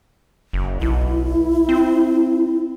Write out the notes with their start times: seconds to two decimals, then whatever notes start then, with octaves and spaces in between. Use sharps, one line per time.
0.53 F#1
0.81 B1 E4
1.69 C4